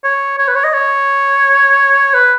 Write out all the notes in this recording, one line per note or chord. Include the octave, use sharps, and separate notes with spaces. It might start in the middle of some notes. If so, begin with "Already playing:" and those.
C#5
C#5
B4
C#5
D#5
C#5
B4